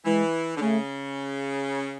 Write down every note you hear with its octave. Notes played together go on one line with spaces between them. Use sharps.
E3 G#3
D3
C#3 A3